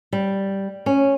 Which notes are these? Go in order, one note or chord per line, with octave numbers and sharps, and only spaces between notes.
G3
C#4